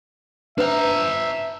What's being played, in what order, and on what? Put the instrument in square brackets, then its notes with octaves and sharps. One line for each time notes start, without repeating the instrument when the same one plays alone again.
[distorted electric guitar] D4 A#5 [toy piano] B4 C5 F#5 [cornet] E5